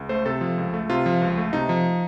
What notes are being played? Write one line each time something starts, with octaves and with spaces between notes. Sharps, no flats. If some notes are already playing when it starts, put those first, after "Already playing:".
Already playing: C#2
A3 C5
C3 A4
F3
C#2
A3
C3 F4
F3
C#2
A3
C3 D#4
F3